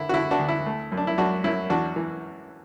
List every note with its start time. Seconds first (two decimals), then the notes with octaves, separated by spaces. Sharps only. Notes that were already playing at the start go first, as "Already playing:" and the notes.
Already playing: D3 E4
0.09 F#4
0.14 D3 E4
0.31 D4 F#4
0.39 D2
0.48 E4
0.66 A3
0.92 F#2
0.97 D4
1.07 E4
1.18 F#2 D4 F#4
1.44 F#2 E4
1.70 E2 D4 F#4
1.96 E3